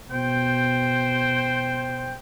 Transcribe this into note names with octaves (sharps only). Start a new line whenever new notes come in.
B2 C5 G5